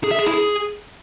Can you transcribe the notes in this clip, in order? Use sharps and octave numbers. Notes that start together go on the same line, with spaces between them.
G#4
E5
G#4
E4
G#4